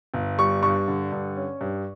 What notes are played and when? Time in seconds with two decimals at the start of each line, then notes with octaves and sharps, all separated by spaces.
0.14 G1
0.38 G3 C#6
0.63 G2 C#6
0.88 D3
1.12 G2
1.36 C#4
1.61 G2